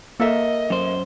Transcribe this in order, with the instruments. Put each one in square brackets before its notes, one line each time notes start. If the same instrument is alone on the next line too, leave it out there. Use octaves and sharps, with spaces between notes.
[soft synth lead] A#3 [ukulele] A4 A#4 E5 [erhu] D#5
[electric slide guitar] F#2 C5